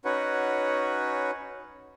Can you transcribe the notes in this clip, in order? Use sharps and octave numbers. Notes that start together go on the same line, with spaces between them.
C#4 D#4 F#4 B4 C#5 F#5